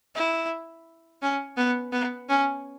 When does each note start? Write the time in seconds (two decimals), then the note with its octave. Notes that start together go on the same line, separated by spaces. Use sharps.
0.15 E4
1.22 C#4
1.57 B3
1.92 B3
2.29 C#4